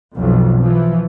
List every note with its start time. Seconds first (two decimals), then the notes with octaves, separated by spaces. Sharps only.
0.15 B1 F2
0.60 E3 F3